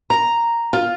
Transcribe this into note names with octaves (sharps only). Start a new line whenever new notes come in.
A#5
F4